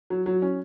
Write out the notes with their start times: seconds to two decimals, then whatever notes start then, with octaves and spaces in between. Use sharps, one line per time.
0.10 F#3
0.26 F#3
0.42 C#4